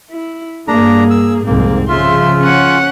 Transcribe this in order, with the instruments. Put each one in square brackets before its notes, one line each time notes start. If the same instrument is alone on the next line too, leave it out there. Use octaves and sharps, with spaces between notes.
[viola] E4
[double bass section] G2 A#3 [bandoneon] D4 A#5 [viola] G#4
[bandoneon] E6
[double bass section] C2 F2 G#2 [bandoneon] A#3 [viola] C4
[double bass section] C#3 F3 [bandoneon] F4 [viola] E5 C6
[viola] C#4 F#5